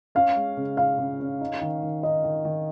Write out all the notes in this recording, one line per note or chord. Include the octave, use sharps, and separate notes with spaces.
C#4 F5
G#3
C#3
G#3 F5
C#3
C#4
D#4
D#3
D#3
D#4 D#5
D#3
D#3